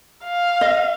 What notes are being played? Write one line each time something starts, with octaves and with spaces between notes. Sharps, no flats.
F5
D#5